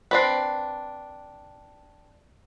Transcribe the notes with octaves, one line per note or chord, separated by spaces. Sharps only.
C4 D4 B4